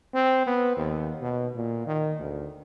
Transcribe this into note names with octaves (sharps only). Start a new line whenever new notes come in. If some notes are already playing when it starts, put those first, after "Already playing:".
C4
B3
D#2
B2
A#2
D#3
D2